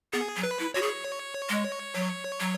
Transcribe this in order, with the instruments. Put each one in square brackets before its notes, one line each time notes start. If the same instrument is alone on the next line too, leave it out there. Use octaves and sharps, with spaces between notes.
[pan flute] B3 [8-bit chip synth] G#4
[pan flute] F#3
[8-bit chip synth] B4
[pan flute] E4
[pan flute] F#4 [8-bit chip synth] C#5
[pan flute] G#4
G#3
F#3
F#3